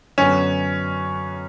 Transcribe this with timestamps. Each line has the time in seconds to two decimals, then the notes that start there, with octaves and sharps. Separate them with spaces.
0.18 F#2 D3 F#3 B3 C#4